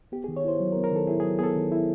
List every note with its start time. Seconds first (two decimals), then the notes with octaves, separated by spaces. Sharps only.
0.12 B3 G4
0.24 G#4
0.28 D#3
0.37 C#5
0.44 E4 C5
0.60 F#3
0.72 A#4
0.77 B3
0.84 A#4
0.92 D#3 A4
1.07 E4 G#4
1.20 G#4
1.23 F#3
1.39 B3 G#4 A4
1.56 D#3
1.72 E4